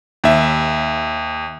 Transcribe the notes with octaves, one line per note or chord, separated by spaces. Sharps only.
D#2 E5